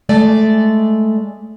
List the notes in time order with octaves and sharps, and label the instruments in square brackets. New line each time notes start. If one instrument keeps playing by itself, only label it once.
[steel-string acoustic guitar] G#3 A3 D5